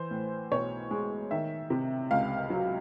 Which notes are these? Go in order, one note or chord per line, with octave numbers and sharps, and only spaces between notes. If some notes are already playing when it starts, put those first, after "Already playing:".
Already playing: E3 C5
A2
B1 C#5
G#3
D#3 E5
C3
C#2 F5
F#3